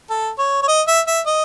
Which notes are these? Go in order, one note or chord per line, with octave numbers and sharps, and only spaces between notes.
A4
C#5
C#5
D#5
E5
E5
D#5